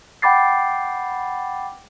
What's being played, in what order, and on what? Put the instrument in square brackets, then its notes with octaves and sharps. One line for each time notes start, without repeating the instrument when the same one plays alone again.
[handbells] F#5 G5 B5 D6 A6 C7